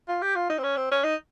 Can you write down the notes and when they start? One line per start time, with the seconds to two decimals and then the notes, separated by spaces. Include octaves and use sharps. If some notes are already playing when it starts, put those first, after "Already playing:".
0.08 F4
0.22 G4
0.35 F4
0.49 D#4
0.58 C4
0.63 C#4
0.77 C4
0.91 C#4
1.04 D#4